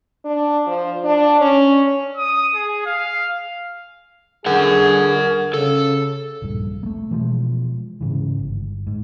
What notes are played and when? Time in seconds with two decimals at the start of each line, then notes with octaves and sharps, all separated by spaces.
0.25 D4
0.66 F3
1.04 D4
1.40 C#4
2.17 D#6
2.55 G#4
2.86 F5
4.46 D3 G#4 A#4 F#5
5.54 C#3 A4
6.42 D#1 A#1 G2
6.83 A3 A#3
7.11 B2 E3 F3 G#3
8.01 G#2 C#3 E3
8.39 G1
8.87 G#2